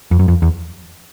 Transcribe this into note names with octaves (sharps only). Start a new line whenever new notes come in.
F2
F#2
F2
E2